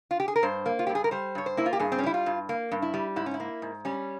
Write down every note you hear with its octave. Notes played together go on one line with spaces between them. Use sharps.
F4
G4
G#4
A#4
G2 C5
A#3
F4
G2 G4
G#4
A#4
G3 C5
G2 C#5
C5
A#3 E4
F4
G4
G2 G#4
C4
C#4
G3 E4
F4
G2
A#3
G2
E4
G3
G#2 E4
C#4
E4
A#3
G#2
G3 C#4